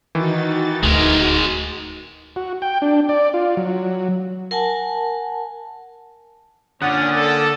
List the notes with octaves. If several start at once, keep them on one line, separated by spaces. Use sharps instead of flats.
D#3 E3 D#4 F#4 A6
D1 D2 G#3 A#4
F#4
G5
D4
D5
F4
F#3
A#4 F#5 G#5 A5
A#2 D3 C#4 D5 F#5 D#6
A4